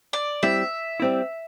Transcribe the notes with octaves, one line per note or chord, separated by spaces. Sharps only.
D5
G3 C4 E4 E5
G3 C4 E4